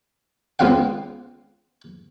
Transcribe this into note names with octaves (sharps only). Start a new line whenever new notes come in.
C#2 B3 C4 F5 F#5